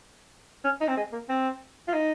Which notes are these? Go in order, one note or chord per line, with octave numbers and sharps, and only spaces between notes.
C#4
D#4
C4
G#3
A#3
C4
F4
D#4